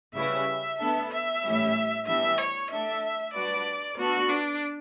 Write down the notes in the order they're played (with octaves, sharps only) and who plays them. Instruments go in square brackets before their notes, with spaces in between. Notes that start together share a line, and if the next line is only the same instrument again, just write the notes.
[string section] C#3 G3 C#4 E4 B4 [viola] E5
[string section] B3 D4 A4
[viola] E5
[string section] A2 E3 G3 C#4 E4
[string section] E3 G3 B3 D4 [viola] E5
[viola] C#5
[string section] A3 D4 A4 D5 [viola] E5
[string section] G3 D4 F#4 B4 [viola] D5
[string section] B3 D4 A4 D5 [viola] F#4
[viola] D4